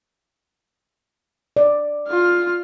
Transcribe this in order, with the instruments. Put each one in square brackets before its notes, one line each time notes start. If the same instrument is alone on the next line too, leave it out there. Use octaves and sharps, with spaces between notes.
[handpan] D5
[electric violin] F4 F6